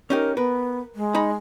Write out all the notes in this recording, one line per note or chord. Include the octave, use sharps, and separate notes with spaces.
C#4 D#4 G4 A#4
B3 A#4 B4
G#3
D#4 A#5 B5